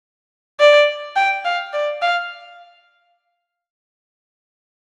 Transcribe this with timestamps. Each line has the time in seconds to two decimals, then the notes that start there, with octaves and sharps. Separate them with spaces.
0.60 D5
1.16 G5
1.45 F5
1.73 D5
2.02 F5